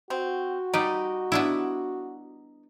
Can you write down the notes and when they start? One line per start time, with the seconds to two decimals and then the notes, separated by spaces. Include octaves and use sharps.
0.10 C4 F#4
0.74 G3 D#4 B4 D5
1.32 B3 D4 E4